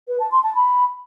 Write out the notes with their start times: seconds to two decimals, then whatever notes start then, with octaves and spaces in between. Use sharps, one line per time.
0.08 B4
0.20 A5
0.31 C6
0.43 A5
0.55 B5